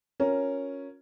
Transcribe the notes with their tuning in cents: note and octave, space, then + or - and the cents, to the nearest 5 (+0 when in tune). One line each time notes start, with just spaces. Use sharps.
C#4 +0 F4 +40 A#4 +0